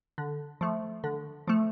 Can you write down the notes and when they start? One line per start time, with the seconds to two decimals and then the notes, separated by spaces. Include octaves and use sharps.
0.18 D3
0.61 F3 A3
1.04 D3
1.47 F3 A3